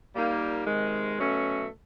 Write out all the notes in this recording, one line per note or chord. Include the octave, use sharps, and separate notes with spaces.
A#2 G3 A#3 D#4
C3 D#3 G#3
B2 F#3 A3 C#4